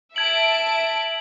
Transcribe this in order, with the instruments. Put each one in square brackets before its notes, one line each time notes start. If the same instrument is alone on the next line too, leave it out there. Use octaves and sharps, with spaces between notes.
[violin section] E5 A5 D7 [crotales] G#6 F#7